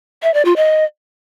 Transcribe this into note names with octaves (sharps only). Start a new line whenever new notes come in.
E5
D5
F4
D#5